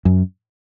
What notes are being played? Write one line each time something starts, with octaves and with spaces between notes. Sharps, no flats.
F#2